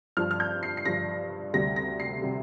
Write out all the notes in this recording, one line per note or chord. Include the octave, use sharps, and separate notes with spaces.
G2 F3 F6
F6
G6
C7
C7
G2 F3 A#6
D2 C3 G3 A#6
A#6
C7
C3 G3